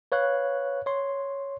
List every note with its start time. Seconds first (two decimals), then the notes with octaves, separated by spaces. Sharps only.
0.12 B4 C#5 F5 F#6
0.86 C#5 C6